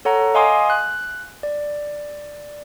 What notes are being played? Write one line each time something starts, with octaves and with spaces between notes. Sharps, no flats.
A4 C#5 F#5 A#5
D#5 F5 G#5 C6 D6 D#6
F#6
D5